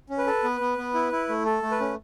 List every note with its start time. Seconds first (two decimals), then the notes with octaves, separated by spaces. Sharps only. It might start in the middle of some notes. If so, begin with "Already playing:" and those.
0.10 C#4
0.18 B4
0.27 A4
0.44 B3
0.61 B3
0.78 B3
0.94 E4
1.12 E4
1.29 A3
1.45 A4
1.62 A3
1.71 B4
1.80 C#4